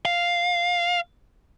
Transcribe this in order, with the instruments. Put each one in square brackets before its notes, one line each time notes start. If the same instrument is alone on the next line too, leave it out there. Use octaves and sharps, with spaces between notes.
[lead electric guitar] F5